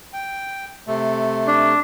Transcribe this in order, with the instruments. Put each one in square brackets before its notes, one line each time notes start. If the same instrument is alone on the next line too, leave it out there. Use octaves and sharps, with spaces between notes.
[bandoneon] G5
C3 A3
[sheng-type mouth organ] D4